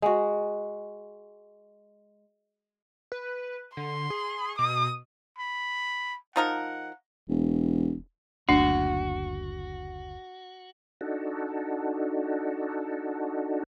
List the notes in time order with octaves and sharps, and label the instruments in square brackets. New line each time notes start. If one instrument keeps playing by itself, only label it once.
[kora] G#3 F#4
[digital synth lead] B4
[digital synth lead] D3 [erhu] C6
[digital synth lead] G#4
[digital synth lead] B2 [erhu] D#6
[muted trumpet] B5
[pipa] F3 D#4 A#4 [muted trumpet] F#5
[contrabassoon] E1
[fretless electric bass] F#1 D2 A3 [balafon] D4 [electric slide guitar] F#4
[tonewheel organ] D4 D#4 F#4 A4